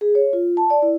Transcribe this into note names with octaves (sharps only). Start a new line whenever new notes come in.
G#4
C#5
F4
A5
D5
E4